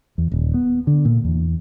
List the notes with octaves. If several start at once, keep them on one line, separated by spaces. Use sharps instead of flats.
E2
D#1
B3
D3
A#2
E2